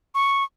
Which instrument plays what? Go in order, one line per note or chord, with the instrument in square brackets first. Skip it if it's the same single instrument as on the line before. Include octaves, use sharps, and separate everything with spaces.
[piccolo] C#6